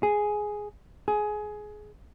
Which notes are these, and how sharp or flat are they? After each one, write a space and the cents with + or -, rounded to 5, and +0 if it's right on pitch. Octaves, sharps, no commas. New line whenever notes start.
G#4 +5
G#4 +20